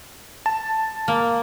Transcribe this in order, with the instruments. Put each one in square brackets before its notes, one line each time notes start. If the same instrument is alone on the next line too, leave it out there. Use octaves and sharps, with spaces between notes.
[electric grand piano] A5
[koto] A#3